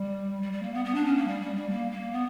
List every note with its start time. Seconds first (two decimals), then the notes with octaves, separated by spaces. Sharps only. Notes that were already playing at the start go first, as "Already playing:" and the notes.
Already playing: G3
0.42 G3
0.52 G3
0.62 A#3
0.74 B3
0.85 B3
0.95 D4
1.05 C#4
1.16 A#3
1.27 G3
1.41 G3
1.55 G3
1.70 A#3
1.91 A#3
2.12 B3